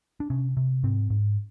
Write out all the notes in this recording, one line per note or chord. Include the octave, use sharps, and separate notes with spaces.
D4
C3 C#4
C3
G#2 C4
G#2